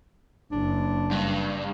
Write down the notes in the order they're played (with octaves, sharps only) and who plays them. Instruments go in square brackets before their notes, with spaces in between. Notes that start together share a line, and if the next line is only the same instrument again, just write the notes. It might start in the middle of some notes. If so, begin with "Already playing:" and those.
[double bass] F#1 [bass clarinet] D4
[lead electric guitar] G2